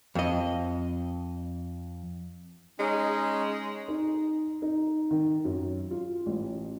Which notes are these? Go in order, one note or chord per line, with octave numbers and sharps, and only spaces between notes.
F2 D#5
G#3 C#4 D#4
D#4
D#4
D#3
F#2
F4
A1